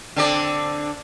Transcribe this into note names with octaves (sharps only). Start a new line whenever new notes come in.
D3 C4 D5